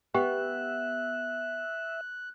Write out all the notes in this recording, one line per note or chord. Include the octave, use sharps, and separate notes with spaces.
B3 G4 E5 G5 F#6